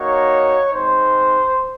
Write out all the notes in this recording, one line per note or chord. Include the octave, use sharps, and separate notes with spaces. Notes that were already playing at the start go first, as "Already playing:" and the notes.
Already playing: A#3 D#4 F#4 C#5
G#3 C4 D#4 C5